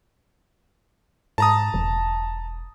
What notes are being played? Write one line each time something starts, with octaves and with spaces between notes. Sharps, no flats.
G#2 A5 A#5 D#6
E1